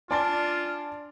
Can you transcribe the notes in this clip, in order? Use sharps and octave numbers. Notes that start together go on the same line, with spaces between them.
D4 F4 D5 G#5 A5 C6 F6 A6